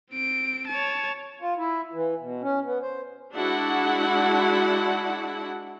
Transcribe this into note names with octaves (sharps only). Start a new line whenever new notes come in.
C4 D7
C#5 A5
F4
E4
E3
B2
C#4
B3
C5
G#3 D4 E4 F#4 F#5